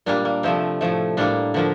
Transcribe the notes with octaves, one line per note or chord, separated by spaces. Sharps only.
A#2 G3 A#3 D4
A#3
C3 F3 A3 C4
A2 F3 A3
A2 G3 A#3 D4
D3 F3 A#3